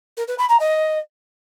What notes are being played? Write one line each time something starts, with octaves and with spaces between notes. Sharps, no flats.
A#4
B4
B5
A#5
D#5